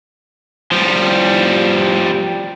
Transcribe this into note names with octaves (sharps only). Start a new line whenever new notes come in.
F3 G3